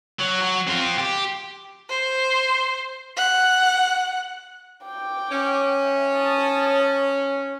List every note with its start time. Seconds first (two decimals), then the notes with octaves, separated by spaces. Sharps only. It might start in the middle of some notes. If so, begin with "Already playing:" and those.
0.20 F#3
0.42 F#3
0.68 C4 F4
0.98 G4
1.89 C5
3.17 F#5
4.84 G5 D6
5.31 C#4
5.85 E5
6.15 A5 D#6
6.83 C#5